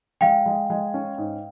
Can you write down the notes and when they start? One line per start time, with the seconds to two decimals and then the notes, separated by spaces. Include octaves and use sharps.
0.21 G#3 F5 G5
0.46 G#3
0.70 G#3
0.94 C#4
1.18 G#2